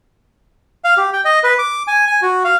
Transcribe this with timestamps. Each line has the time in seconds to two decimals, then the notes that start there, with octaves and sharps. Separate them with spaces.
0.84 F5
0.97 G4
1.13 G5
1.25 D#5
1.44 B4
1.59 D6
1.87 G#5
2.07 G#5
2.22 F#4
2.44 F5